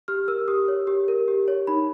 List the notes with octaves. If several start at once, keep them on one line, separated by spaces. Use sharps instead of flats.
G4 F6
A#4 E6
G4 D#6
C#5
G4
A#4
G4
C#5
D#4 B5